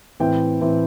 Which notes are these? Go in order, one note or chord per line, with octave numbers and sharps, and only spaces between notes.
A2 E3 C4 G5
A2 E3 C4